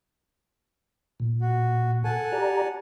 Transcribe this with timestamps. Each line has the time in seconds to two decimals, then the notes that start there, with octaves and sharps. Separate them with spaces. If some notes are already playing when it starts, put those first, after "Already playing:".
1.20 A#2
1.41 F#4
2.04 A4 F#5 G#5 A5
2.33 G4 D5 A#5